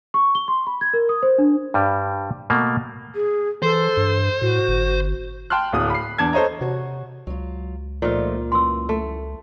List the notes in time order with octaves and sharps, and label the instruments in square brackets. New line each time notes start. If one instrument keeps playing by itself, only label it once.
[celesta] C#6
G7
C6
B5
G#6
A#4
D#6
C5
D4
[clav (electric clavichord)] G2 G3
B2 A3 A#3
[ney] G#4
[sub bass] E3 [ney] A4 [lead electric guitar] C5
[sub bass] G2
[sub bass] A2 [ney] F#4
[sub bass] G1
[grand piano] G5 A5 C6 F6 F#6
D1 D2 D#6
B5 C7
E2 D4 A5 G#6
A4 C5 C#5 D#5 A#5
[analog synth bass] C3 [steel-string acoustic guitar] F#4 C#5
[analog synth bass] C#2 [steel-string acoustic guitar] F#3 F4
[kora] A#2 F4 [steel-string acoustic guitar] F3 A3 D#4
[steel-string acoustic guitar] F#2 E3 [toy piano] C6 E6
[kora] A3